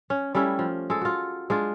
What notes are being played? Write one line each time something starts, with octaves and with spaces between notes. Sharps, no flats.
C#4
G3 A3 C#4 E4
F3
G#3 A4
F4 F#4
G#3 D4 F4